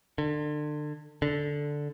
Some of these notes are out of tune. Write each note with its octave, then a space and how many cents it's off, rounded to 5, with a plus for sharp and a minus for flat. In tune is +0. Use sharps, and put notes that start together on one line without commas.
D3 +30
D3 -5